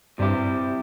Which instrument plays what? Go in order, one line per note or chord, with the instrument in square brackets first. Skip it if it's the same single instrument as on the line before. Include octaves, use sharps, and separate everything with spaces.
[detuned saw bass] G2 [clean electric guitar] C3 G3 E4 G4